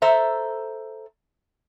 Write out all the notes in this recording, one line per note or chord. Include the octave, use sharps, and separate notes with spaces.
A4 C5 E5 A#5